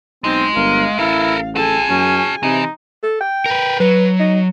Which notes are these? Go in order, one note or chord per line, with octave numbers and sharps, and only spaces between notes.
B1 G#3 C4 D#4
G1 A#4 F5
A1 E4 A4 A#4
F#4 G#4 A4 G#5 A5
F#2 C#4
C3 E3 D#4
A4
G5
A#4 B4
F#3 B4
D#4